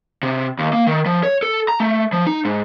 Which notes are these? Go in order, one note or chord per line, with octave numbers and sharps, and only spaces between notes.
C3
D#2
A#3
D#3
F3
C#5
A4
A#5
A3
F3
D#4
G#2